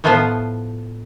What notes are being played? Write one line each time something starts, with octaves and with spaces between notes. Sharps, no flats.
A2 F3 B3 F4 B4 C5